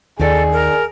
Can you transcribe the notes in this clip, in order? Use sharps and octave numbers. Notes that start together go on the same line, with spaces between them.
D#2 D#3 G#4 A4 D5
A#4